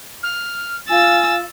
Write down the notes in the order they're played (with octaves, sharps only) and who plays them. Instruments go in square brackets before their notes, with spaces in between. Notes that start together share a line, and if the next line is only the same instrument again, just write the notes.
[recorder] F6
[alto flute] F4 [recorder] G#5 [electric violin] E6 A6